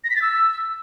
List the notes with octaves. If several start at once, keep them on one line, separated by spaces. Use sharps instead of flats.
A#6
B6
A6
E6